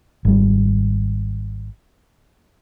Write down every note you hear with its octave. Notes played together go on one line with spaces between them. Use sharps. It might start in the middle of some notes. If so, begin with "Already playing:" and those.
G#1 G3